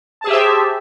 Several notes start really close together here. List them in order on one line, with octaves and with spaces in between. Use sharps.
A5 G#4 G4 E5 C5